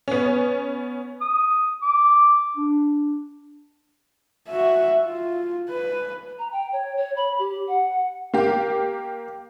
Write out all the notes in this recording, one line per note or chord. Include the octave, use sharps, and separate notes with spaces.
B3 C#4
D#6
D6
D4
F#4 E5
F4
B4
A#5
G5
C#5
C#5
B5
G4
F#5
A#3 G4